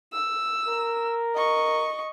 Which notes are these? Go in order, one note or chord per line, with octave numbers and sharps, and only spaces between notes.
E6
A#4
D#5 C#6